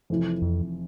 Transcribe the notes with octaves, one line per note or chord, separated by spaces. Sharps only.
F1 F2 E3
F2